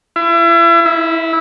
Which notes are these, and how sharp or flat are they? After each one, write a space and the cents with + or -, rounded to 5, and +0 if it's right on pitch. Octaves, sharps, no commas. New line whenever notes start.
E4 +35
E4 -15